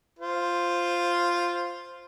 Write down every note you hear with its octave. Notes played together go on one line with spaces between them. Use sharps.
F4 C5